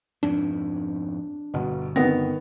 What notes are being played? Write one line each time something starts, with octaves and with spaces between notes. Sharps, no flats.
F2 G#2 B2 D4
G1 B2
D#3 B3 C4 A#6